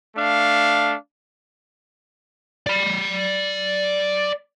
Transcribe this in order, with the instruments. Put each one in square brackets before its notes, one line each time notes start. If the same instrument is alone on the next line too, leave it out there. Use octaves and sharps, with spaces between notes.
[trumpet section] A3 D4 F5
[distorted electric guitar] D5 B5